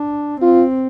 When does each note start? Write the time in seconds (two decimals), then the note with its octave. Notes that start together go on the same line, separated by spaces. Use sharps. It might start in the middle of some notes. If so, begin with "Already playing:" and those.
Already playing: D4
0.41 C4 F4